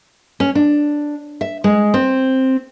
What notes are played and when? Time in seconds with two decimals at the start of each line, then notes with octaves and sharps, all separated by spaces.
0.40 C#4
0.55 D4
1.41 E5
1.64 G#3
1.94 C4